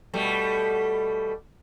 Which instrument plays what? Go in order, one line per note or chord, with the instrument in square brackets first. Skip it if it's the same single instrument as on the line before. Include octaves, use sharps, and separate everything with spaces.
[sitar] B2 G3 A3